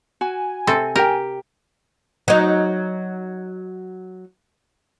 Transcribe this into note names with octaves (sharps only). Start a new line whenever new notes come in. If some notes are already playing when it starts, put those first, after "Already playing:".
F#4 G#5
C3 C4 A4
G4 A#4 G5
F#3 D#4